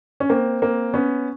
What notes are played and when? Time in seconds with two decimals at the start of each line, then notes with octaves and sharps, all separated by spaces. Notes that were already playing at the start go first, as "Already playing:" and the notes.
0.20 C#4
0.29 A#3 C4
0.62 A#3 C4
0.94 B3 C#4